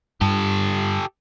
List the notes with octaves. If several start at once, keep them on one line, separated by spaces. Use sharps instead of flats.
G2 G4 A4